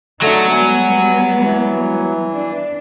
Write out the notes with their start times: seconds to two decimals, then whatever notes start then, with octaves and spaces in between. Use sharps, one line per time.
0.22 D3 F#3 A3 D#4 A4 A#5
0.51 G3 G#3 B3 G#5
1.43 E3
2.31 D4